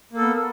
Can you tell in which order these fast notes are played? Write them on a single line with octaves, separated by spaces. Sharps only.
A#3 A4 B3